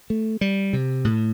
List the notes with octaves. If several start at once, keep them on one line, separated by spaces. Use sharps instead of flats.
A3
G3
C3
A2